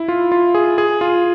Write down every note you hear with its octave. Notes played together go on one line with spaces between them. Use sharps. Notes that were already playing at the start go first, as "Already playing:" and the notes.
Already playing: E4
F4
F4
G#4
G#4
F4